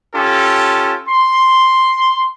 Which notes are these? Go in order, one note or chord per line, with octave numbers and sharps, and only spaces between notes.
C#4 F4 G4 A4
C6